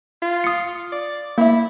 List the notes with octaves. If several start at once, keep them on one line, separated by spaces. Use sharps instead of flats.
F4
D#6 C#7
D5
A#3 E4 E5